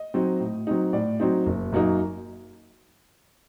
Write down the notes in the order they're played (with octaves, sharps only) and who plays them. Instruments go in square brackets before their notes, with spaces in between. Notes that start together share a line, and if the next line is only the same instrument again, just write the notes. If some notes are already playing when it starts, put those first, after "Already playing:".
Already playing: [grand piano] D#5
F#3 C4 D#4
A2
F#3 C4 D#4
A2 D5
F#3 C4 D#4
F#1
F#2 F#3 A#3 D#4